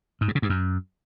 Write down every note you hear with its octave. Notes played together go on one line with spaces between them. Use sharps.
G#2
G2
C#3
G2
F#2